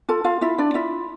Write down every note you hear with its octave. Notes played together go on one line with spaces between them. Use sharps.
F4 A4 A5
F4 F5
E4 F4 E5
D4 D5
E4 F4 E5